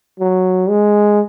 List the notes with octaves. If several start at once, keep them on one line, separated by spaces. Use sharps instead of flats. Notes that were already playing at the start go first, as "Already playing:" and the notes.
F#3
G#3